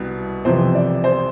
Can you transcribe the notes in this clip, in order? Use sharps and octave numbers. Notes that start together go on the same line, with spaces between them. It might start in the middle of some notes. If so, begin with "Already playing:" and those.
Already playing: C2 B2
F2 C3 E3 C5
D5
C5